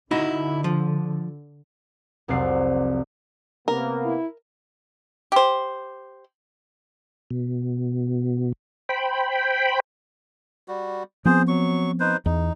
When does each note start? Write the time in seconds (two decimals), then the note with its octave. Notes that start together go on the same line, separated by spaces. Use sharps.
0.11 D3 D#4 E4 F#4
0.64 F3
2.28 F1 C2 F#3 D5 C7
3.68 C3 A#3 B3 A#4
4.05 E4
5.32 G4 C5
7.31 B2
8.89 C5 G5 B5
10.68 G3 F#4
11.25 F3 B3 C4 G#4 C5
11.48 F#3 C#6
12.00 D#4 B4 C5
12.26 E2 D#4